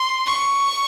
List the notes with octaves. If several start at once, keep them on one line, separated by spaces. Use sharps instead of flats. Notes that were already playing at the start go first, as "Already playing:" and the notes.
Already playing: C6
C#6